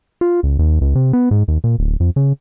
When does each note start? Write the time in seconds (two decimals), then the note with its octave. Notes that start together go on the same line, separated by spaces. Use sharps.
0.21 F4
0.43 C#2
0.59 D#2
0.81 C#2
0.95 C3
1.13 B3
1.31 G#2
1.48 D#2
1.64 A#2
1.78 D1
2.00 F2
2.16 C#3